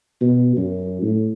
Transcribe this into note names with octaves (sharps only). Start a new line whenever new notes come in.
B2
F#2
A2